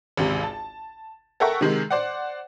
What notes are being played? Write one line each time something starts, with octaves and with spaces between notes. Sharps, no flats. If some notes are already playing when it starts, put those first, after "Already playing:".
G#1 C#2 C3
A5
A4 A#4 E5 F#5 G5 C#6
C3 D#3 G#3
C5 D5 F#5